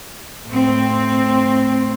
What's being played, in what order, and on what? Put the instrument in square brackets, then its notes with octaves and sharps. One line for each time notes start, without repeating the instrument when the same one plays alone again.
[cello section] A2 C4